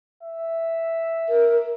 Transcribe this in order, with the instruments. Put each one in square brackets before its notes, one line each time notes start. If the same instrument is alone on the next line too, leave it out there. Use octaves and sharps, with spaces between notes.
[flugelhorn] E5
[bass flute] A#4